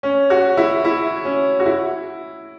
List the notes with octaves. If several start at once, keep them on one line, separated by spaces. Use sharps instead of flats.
C#4
F#4
E4
E4
C#4
F#4
E4